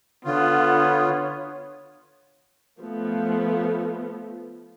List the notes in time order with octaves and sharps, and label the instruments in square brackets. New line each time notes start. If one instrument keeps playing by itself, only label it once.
[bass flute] D3 [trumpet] B3 [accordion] F4 [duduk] C#5
[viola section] F3 A3 B3